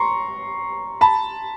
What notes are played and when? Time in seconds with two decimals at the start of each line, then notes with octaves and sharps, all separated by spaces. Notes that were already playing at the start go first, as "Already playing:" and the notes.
Already playing: A#5 C6 C#6
1.01 A5 B5